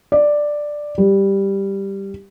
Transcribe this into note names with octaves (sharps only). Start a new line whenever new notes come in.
D5
G3